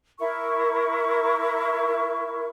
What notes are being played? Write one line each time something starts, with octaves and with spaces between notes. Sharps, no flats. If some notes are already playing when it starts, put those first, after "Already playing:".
E4 A#4 C#6